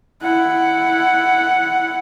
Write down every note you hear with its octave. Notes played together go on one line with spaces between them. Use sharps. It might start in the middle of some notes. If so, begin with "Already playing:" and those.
E4 F#5